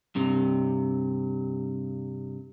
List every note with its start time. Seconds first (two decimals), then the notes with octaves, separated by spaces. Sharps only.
0.15 G2 C3